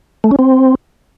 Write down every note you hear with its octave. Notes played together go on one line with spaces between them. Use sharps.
A3
C#4
C4